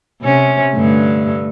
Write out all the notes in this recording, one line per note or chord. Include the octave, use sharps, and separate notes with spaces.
C3 C#4
G2 D3 A3